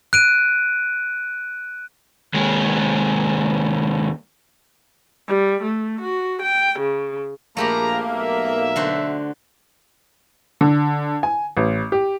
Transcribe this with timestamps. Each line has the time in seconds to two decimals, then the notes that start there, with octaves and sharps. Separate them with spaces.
0.13 F#6 D7 D#7
2.34 D#2 G#3
5.26 G3
5.62 A3
6.01 F#4
6.40 G5
6.79 C#3
7.57 A#1 A3 A#3 G4 G#4 A#5 B5
8.07 B1 E5
8.76 D3 F#4 C5
10.61 D3
11.23 G#5
11.57 A1
11.92 G4